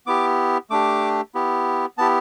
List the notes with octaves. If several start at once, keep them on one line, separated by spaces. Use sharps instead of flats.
B3 E4 G4 D6
A3 D4 G4 D6
B3 E4 G4
B3 E4 G4 A5